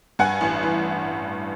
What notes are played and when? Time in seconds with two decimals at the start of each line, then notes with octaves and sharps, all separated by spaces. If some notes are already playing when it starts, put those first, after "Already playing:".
0.19 G2 F#5 G#5
0.41 A1
0.63 E3